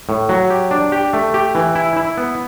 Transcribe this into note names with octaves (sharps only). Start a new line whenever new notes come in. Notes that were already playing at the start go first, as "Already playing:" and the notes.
A2
F#3
G4
D4
G4
A3
G4
E3
E4
E4
B3